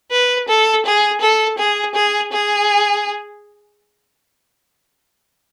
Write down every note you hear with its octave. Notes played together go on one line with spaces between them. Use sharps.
B4
A4
G#4
A4
G#4
G#4
G#4